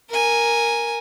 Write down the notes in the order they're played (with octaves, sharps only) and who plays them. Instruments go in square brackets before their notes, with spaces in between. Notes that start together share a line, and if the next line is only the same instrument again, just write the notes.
[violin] A#4 G#5